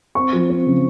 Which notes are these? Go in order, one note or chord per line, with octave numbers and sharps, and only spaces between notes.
C4 C#6
F3
C4
C#3